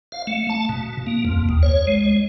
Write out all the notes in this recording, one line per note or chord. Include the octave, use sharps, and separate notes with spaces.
F5
A3
A5
B2
A#3
F2
D#2
C#5
G#3